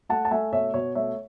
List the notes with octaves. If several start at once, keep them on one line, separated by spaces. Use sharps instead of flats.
A3 F#5 A5
A5
A3 E5 G#5
B2 C#5 E5
B2 C#5
A3 C#5 E5